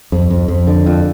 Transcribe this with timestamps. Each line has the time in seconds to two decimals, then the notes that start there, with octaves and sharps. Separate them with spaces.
0.12 F2
0.30 F2
0.48 F2
0.67 D3
0.86 F2